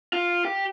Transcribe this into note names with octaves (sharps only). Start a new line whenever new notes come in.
F4
G4